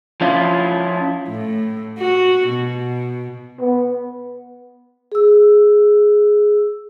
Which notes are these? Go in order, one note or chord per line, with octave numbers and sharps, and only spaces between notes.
F3 C#4 E4 F4
A2
F#4
B2
B3
G#4 E6